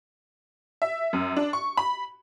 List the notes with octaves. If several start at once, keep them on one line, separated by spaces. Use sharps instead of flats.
E5
F#2
D4
C#6
B5